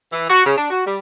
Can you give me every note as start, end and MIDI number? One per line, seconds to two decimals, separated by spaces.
0.12 0.25 52
0.28 0.40 66
0.45 0.54 49
0.57 0.68 62
0.70 0.81 66
0.85 0.97 55